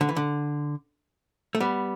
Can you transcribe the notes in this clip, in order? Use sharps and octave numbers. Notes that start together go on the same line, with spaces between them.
D3
E3
D3
A3
G3 B3